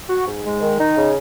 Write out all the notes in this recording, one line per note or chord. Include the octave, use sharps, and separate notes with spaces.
F#4
G#2
G#3
D#3
D#4
C#3